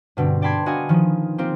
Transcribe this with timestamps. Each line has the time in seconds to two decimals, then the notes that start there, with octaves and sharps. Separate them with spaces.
0.17 G2 B2 D3 C4
0.42 D5 G5 A5 B5 C6 G#6
0.66 D4 F#4 D#5 F5 G#5
0.89 D#3 F3
1.38 A#3 C4 F4 G4